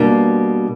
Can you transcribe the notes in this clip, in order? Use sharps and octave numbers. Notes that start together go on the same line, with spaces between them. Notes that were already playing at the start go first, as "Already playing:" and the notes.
Already playing: B2 G3 A#3 D4